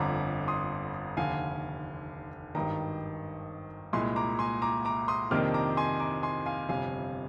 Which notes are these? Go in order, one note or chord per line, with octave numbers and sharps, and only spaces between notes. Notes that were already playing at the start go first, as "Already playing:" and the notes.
Already playing: G1 F2 D3 A#5 D6
C6 D#6
F1 D#2 D3 F5 G#5
G#1 G2 D#3 G5 A#5
C2 A#2 G#3 G#5 C6
A#5 D6
G#5 C6
A#5 D6
A#5 D6
C6 D#6
F2 C3 D#3 A#3 D4 D6 F6
A#5 D6
G#5 C6
A#5 D6
G#5 C6
F5 G#5
G1 F2 C3 F5 G#5